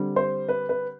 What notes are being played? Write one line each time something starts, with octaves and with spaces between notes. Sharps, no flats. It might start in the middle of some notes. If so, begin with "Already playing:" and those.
Already playing: D3 G3 C4
C5
B4
B4